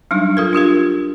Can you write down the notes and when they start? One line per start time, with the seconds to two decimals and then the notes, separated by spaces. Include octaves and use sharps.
0.11 F#3 G3 D4 D#4
0.37 F4 A4 A#4
0.53 D4 F4 G4 A#4